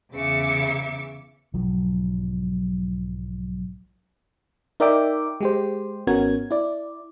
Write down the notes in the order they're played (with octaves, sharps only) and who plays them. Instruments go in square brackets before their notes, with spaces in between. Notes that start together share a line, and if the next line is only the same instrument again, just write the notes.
[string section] E2 C#3 E5 D6 C#7
[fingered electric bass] B1 G#2 F3 F#3
[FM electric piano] D#4 A#4 D5 E5 G5 D6
G#3 G4 C5
G#1 B3 C#4 F#4 A#4 G#6
E4 D5